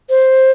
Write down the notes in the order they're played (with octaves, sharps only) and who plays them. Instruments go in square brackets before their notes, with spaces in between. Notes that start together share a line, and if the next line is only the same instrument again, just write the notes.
[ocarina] C5